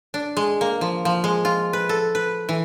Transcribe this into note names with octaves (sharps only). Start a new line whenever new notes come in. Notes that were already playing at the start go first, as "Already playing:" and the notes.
D4
G#3
A#3
F3
F3
G#3
F4
B4
A4
B4
E3